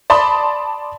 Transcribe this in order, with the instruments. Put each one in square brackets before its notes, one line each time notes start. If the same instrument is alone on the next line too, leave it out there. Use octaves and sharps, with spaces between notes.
[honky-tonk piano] D5 A5 B5 C6 D#6